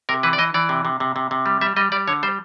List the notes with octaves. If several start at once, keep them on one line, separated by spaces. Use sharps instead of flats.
C3 A#4
E3 B4
D5
E3 D#5
E3 D5
C3
C3
C3
C3
C3
G3
G3 E5
G3 D#5
G3 D5
D3 C#5
G3 C5